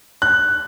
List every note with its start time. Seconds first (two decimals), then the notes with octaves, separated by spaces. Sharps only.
0.22 F#6